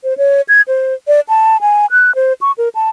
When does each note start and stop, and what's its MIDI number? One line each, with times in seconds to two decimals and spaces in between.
0.04 0.17 72
0.17 0.41 73
0.49 0.61 92
0.68 0.94 72
1.08 1.20 74
1.29 1.61 81
1.61 1.86 80
1.91 2.14 90
2.15 2.33 72
2.41 2.52 85
2.58 2.69 70
2.75 2.89 81